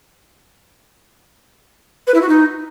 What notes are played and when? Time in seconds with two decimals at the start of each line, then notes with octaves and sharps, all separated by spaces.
2.07 B4
2.14 E4
2.21 F#4
2.29 D#4